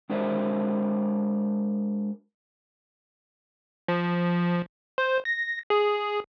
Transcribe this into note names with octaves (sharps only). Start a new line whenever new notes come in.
G#3 D4 F#4 A#4 C5 E5
F3
C5
A#6
G#4